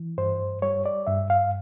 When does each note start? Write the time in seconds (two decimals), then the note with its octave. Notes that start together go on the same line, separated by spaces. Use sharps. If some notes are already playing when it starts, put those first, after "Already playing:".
Already playing: E3
0.18 G2 C5
0.62 G3 C#5
0.86 D5
1.07 G2 E5
1.30 F5